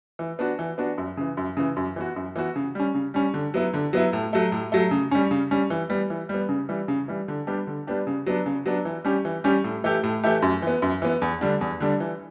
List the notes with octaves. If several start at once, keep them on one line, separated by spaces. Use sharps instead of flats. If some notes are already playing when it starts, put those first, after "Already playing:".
E3
B3 D4 F#4
E3
B3 D4 F#4
F#2
C#3 E3
F#2
C#3 E3
F#2
E3 B3 F#4
F#2
E3 B3 F#4
C#3
G3 C#4
C#3
G3 C#4
D3
F#3 B3 E4
D3
F#3 B3 E4
A2
F#3 A3
A2
F#3 A3
C#3
G3 C#4
C#3
G3 C#4
E3
G3 B3
E3
G3 B3
C#3
E3 G3
C#3
E3 G3
D3
G3 B3 D4 G4
D3
G3 B3 D4 G4
C#3
F#3 B3 D4
C#3
F#3 B3 D4
E3
G3 C#4 G4
E3
G3 C#4 G4
A2
E3 A3 E4 G4
A2
E3 A3 E4 G4
F#2
E3 B3
F#2
E3 B3
E2
D3 G3 D4
E2
D3 G3 D4
E3